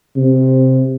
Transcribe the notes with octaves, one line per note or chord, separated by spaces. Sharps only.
C3